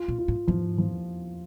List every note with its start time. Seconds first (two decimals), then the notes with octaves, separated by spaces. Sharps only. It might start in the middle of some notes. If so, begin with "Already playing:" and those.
Already playing: F4
0.08 A#2
0.19 F4
0.28 A2
0.47 G#2 F3
0.78 F3